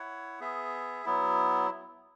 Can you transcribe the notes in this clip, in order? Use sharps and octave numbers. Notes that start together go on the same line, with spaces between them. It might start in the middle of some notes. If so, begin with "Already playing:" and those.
Already playing: E4 C#5 F#5
B3 G#4 E5
F#3 B3 E4